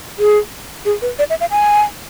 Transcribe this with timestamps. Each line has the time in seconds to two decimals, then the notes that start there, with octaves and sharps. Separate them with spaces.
0.18 G#4
0.85 G#4
1.02 B4
1.19 D5
1.30 E5
1.41 F5
1.51 G#5